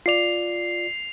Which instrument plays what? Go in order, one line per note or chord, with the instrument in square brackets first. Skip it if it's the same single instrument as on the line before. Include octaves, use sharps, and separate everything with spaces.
[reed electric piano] F4 D5 [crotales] C7 F7